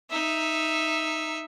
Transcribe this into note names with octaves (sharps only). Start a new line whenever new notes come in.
D#4 E5